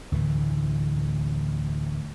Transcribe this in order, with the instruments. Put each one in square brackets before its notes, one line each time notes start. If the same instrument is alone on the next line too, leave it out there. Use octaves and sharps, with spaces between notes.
[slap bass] D2 A2 E3